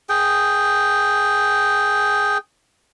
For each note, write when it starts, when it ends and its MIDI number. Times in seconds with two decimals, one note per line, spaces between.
0.09 2.38 68
0.09 2.38 79